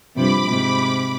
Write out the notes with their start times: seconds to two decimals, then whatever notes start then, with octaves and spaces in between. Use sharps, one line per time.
0.15 G2 C3 F3 B5 D6
0.48 G#2 C3